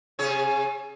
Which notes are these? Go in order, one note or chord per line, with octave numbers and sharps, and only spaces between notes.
C3 G#4 C#5